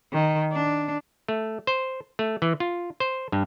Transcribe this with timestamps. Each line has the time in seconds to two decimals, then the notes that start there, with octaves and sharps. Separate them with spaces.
0.13 D#3
0.53 D4
1.28 A3
1.67 C5
2.19 A3
2.42 E3
2.60 F4
3.00 C5
3.32 G2